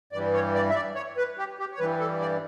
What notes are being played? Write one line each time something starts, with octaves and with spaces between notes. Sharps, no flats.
G2 E3 G3 D5
C#5
D5
E5
D5
C#5
B4
G4
G4
C#5
G2 E3 G3 B4
A4
D5